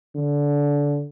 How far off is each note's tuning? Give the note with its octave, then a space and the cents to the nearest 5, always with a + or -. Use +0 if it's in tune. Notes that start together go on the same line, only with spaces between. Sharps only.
D3 -20